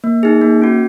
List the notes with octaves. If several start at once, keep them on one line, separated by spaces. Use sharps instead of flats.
A#3
D#4 G#4
A#3
C#4 F#4